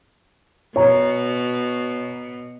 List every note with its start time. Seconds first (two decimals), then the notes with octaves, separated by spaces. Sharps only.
0.76 B2 C#5 A#5